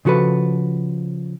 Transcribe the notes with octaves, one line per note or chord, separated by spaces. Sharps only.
C#3 F3 F#4 A4 B4